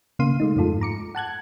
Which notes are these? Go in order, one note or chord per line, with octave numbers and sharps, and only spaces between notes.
C#3 A#3 F5 C6 D#7
G#3 A3 D#4
F2 G#2 G#3 F4 A4
A#5 D6 C#7
F#5 A5 F#6 G#6